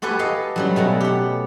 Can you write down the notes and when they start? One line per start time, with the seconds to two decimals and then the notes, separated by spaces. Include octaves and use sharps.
0.02 F#4 G4 A4 B4 G#5
0.19 A4 D#5 F5
0.56 F#3 G3 C#4
0.76 B2 A3 F#5
1.01 G4 F#5